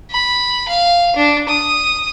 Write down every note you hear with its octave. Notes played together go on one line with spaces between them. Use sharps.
B5
F5
D4
D#6